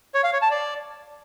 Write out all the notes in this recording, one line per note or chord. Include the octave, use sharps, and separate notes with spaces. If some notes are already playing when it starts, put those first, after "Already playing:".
C#5
F5
C#5
A5
D5